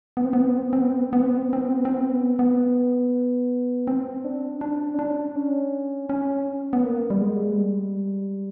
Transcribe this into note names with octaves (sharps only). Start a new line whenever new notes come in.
B3
C4
B3
C4
B3
C4
B3
C4
B3
C4
B3
C4
B3
C4
B3
C4
B3
C4
B3
C4
B3
C4
B3
C4
B3
B3
C4
D4
D4
C#4
D4
C#4
C#4
B3
A#3
G3
G#3
G3